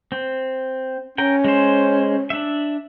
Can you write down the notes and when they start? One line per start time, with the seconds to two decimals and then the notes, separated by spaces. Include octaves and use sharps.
0.12 C4
1.18 C#4 A#4 G5
1.44 G#3 C5
2.30 D4 E5